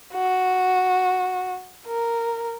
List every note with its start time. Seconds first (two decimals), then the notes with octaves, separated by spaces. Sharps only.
0.13 F#4
1.86 A#4